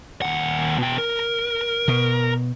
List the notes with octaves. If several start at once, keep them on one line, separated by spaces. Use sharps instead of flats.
D#2 F#5
B2 G5
A#4
B2